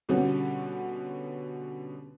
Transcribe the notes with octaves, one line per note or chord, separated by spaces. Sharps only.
B2 D3 G3 B3 C#4 F#4